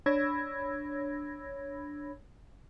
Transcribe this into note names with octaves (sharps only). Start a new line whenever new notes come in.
D4 C#5 B5 E6 G#6 A#6